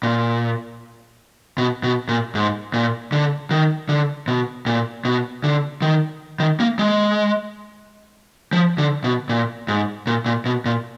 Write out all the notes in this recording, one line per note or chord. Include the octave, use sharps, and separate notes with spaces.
A#2
B2
B2
A#2
G#2
A#2
D3
D#3
D3
B2
A#2
B2
D3
D#3
D#3
A#3
G#3
F3
D3
B2
A#2
G#2
A#2
A#2
B2
A#2